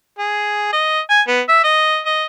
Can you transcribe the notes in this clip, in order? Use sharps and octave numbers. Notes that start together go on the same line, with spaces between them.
G#4
D#5
G#5
B3
E5
D#5
D#5